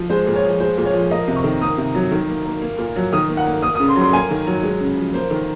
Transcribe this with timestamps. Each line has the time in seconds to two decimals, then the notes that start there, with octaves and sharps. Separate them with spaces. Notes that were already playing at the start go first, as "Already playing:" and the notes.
Already playing: F3
0.10 G#3 C5
0.27 A#2
0.36 C#5
0.44 F3
0.60 G#3 C5
0.78 A#2
0.86 C#5
0.94 F3
1.11 A#3 D#5
1.28 C3
1.36 C#6
1.44 D#3
1.61 A#3 D#6
1.77 C3
1.95 F#3
2.12 D#3
2.29 A#3
2.46 A#3
2.62 A#3
2.78 A#2
2.96 F#3
3.13 D#3 D#6
3.29 A#3
3.37 F#5
3.47 A#3
3.62 A#3 D#6
3.75 D#6
3.80 C#3
3.88 C6
3.96 F#3
4.01 C6
4.13 A#3 G#5
4.30 D#3
4.47 F#3
4.63 G#3
4.81 C#3
4.97 F3
5.13 A#3 C5
5.31 D#3